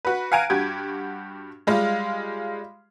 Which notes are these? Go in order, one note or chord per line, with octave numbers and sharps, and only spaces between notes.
F#4 B4
F5 F#5 G#5 A#5 D7 D#7
G2 F#4 G4 G#6
G3 G#3 F4 F5